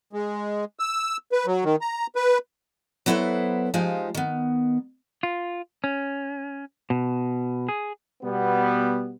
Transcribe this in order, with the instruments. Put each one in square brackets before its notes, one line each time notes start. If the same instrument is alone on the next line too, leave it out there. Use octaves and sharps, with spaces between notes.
[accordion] G#3
E6
B4
F#3
D#3
A#5
B4
[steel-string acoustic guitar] F#3 B3 E4 A4 B4 C5
F3 G#3 D#4 F4 G4 C5
D#3 B3
[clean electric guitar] F4
C#4
B2
G#4
[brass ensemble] B2 G3 B3